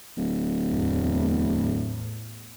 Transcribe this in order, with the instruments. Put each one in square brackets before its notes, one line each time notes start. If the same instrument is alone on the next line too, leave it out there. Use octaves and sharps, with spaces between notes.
[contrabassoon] D1
[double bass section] E2 A2